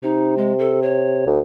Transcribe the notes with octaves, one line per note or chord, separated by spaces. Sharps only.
C3 D#4
G#3
A4
C#5
D2